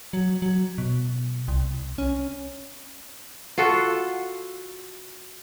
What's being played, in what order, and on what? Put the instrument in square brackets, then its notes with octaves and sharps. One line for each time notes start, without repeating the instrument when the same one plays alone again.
[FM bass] F#3
F#3
B2
C2
C#4
[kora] F4 F#4 A4